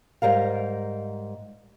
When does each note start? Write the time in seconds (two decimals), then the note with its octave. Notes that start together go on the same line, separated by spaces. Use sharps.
0.22 G#2 G3 A#4 F5